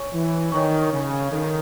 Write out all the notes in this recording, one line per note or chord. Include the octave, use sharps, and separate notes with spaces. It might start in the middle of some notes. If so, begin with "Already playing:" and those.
Already playing: C#5 G#5 C#6
E3
D#3 C#5 G#5 C#6
C#3
D#3 D#4 A4 C#5